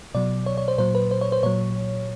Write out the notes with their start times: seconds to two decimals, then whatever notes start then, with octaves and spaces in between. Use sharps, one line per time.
0.14 B2 F#3 D5
0.46 C#5
0.58 C#5
0.68 C5
0.78 A#2 F#3 C5
0.95 B4
1.11 C5
1.21 C#5
1.32 C5
1.43 A#2 F#3 C#5